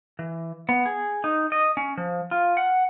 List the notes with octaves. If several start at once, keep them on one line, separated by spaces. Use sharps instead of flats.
E3
B3
G#4
D#4
D#5
C#4
F3
F4
F#5